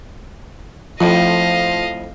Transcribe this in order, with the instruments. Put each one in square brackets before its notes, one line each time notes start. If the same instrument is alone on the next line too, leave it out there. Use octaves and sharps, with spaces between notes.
[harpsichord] F2 A2 [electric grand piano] F3 [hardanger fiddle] D#5 F5